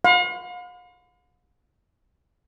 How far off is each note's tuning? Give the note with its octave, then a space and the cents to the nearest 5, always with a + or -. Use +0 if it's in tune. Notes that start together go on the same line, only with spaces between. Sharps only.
F5 +45 B5 +40